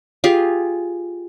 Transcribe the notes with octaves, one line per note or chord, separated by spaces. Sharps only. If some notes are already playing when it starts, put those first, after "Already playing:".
F4 G4 G#4